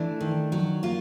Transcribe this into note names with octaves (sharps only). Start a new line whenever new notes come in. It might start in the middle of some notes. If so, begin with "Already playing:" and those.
Already playing: E3 A3 D4
D#3
F#3
A#3 F4